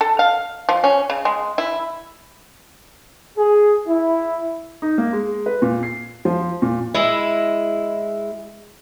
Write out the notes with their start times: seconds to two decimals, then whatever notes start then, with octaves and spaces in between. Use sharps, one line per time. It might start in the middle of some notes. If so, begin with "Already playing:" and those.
0.01 A4
0.19 F5
0.69 F3
0.84 C#4
1.10 C#3
1.25 G#3
1.58 E4
3.37 G#4
3.87 E4
4.82 D#4
4.98 A#3
5.13 G#3
5.46 B4
5.62 A#2
5.83 C7
6.25 F3
6.62 A#2
6.95 G#3 E4